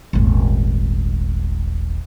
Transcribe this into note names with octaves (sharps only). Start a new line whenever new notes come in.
D#1 G#1